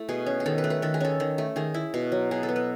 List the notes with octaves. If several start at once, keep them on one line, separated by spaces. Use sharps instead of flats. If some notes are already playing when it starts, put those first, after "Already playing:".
Already playing: A3 E4
B2 G#4
C#4
G#4
D#3 A4
B4
A3
B4
D#3 A4
G#4
C#4 A4
D#3
A3
D#3 G#4
E4
B2
F#3
B2 G#4
A4
B3
B4